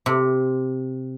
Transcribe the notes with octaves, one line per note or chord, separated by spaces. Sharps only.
C3